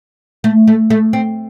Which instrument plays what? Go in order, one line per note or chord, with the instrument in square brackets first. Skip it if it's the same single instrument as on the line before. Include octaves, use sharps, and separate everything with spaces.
[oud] A3
A3
A3
C4